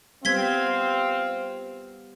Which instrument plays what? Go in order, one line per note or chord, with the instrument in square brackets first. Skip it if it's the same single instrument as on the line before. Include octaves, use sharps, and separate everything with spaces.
[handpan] G3 B3 [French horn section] C4 [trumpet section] F4 F5 [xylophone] G#6 B6 G7